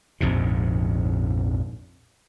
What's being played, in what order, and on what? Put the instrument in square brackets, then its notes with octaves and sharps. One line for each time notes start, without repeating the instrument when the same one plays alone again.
[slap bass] A#1 F2 G#2 C3